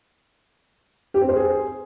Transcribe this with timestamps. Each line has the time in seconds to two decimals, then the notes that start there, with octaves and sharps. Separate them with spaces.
1.14 G4
1.21 C4
1.29 C5
1.36 G#4